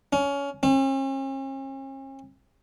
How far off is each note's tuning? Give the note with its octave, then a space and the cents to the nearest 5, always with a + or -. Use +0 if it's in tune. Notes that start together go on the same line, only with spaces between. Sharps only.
C#4 +20
C#4 -45